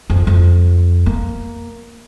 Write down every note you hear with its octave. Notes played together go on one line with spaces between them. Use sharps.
F2
F2
A#3